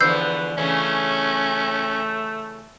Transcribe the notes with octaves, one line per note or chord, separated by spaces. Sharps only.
E2 D3 F3 B4 E6 G6 C7
C#3 E3 A3 C#4